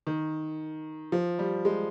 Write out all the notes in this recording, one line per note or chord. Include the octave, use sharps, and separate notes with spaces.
D#3
F3
G3
G#3